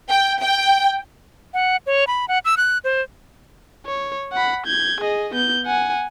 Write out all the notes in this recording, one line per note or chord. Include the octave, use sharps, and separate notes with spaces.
G5
G5
F#5
C#5
B5
F#5
E6
F#6
C5
C#5
F#5 B5
G6 G#6
G#4 D#5
B3 G6
F#5 G#5